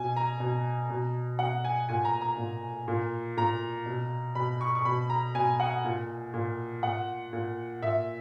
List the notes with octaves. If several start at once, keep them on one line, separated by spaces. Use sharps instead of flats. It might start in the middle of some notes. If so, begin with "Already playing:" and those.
Already playing: B2 G#5
A#5
B2
B2
B2 F#5
G#5
A#2 G#5
A#5
A#5
A#2
A#2
A#2 A#5
B2
B2 B5
C#6
C#6
B2 B5
A#5
B2 G#5
F#5
A#2
A#2
A#2 F#5
A#2
A#2 E5